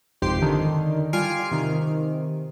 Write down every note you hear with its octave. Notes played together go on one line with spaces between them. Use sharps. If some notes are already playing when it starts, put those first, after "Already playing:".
G#1 F2 C3 G4 C6
D3 D#3
G3 F4 G#5 F6 C7 D7
C3 D#3